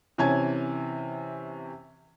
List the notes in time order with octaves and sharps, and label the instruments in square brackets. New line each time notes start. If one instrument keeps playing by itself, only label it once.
[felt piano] C3 E3 C#4 G#5 A5 G#6